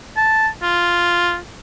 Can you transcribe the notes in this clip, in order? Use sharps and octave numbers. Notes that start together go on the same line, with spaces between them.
A5
F4